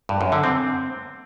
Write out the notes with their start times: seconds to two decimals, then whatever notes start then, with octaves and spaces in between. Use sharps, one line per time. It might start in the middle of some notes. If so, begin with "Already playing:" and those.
0.09 G2
0.21 F#2
0.32 D3
0.43 C4